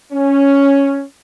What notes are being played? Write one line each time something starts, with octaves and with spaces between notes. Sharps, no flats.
C#4